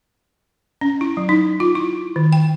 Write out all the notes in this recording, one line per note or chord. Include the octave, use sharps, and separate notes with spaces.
C#4
E4
F#3
D#4
F4
E4
D#3
G5